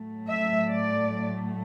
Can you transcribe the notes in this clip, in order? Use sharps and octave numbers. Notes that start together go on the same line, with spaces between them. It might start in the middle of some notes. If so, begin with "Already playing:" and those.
Already playing: A2 F#3 A3
E5
D5